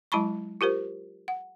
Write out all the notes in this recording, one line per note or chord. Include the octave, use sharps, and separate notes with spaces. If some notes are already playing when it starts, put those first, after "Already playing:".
F#3 G#3 E4 A5 B5 C#6
F4 G4 A#4 C5
F#5